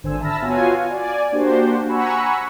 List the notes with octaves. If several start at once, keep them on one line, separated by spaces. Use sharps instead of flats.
G#1 D3 C5 G#5 E6
E5 A5 B5 E6 F6 A#6
B3 F4 F#4 C#5 F5 G#5
D5 G#5
A#3 D4 F#4 G4 C5
F#5 G#5 A#5 B5 C#6 E6